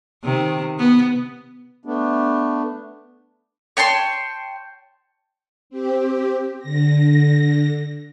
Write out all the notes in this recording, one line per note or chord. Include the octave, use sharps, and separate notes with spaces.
C3 D#3
B3
A3 B3 D4
C#5 G5 A5 C6
C4 G4
D3 A#6